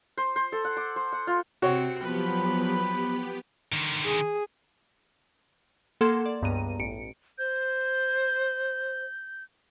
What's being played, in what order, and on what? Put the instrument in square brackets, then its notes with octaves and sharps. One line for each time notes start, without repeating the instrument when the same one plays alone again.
[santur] C5
C5
A4
F#5
D6
C5
F#5
F4
[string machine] C3 C#7 [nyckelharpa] C4 [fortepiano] F#4 C#5
[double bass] F3 F#3 [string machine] B3 G4 [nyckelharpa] B4 B5
[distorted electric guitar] D3 D#3
[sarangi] G#4
[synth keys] A#3 A4 F#5 C6 G#6 E7
D5
C#2 G2 B3 A#5 D#7
A1 C#7 D7
[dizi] C5 [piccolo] G6